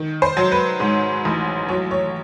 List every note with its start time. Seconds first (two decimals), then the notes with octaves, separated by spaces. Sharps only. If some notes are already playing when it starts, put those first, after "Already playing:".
Already playing: D#3
0.22 C5
0.37 F#3
0.52 B4
0.80 G#2
1.25 A1
1.68 F#3 C#5
1.91 C#5